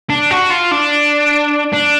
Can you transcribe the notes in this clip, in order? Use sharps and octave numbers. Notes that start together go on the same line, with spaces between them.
D4
F#4
F4
D4
D4